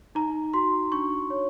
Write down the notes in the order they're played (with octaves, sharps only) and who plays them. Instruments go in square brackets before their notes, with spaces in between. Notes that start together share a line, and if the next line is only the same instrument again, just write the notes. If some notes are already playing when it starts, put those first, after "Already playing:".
[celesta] D#4 A#5
F#4 C6
D4 C#6
C#5